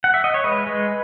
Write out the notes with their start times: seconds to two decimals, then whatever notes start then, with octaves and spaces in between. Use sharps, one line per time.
0.04 F#5
0.14 E5
0.24 D#5
0.34 C#5
0.44 G#3 B4
0.67 G#3